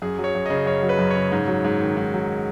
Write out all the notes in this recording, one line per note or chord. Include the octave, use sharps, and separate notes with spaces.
F#2 G#4
F#3
C#5
F#2
C#3 D#5
F#2 C#5
F#3
B4
F#2
C#5
C#3
G#2
F#3
G#2
D#3
G#2
F#3